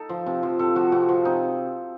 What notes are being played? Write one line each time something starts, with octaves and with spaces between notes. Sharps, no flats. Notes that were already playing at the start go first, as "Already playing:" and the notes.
Already playing: D#4 A4
F3
C3
F3
C3 A4
F3 F#4
C3 F#4
F3 F#4
C3 D#4